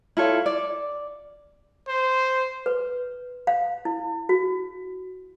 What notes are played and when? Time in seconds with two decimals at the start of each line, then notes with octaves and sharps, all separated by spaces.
0.17 E4 F4 A4 C#5
0.46 D5
1.88 C5
2.66 B4
3.47 F5
3.85 E4
4.29 F#4